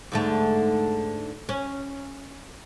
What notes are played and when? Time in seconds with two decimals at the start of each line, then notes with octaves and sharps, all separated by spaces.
0.12 G#2 D3 A3
1.49 C#4